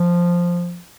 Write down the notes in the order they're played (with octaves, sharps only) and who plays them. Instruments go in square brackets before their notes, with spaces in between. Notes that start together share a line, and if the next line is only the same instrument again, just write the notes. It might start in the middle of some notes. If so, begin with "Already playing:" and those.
Already playing: [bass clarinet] F3